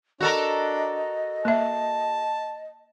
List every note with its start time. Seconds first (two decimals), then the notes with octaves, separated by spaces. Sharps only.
0.21 D4 F#4 A4 A#4 D#5
1.45 A#3 E5 A5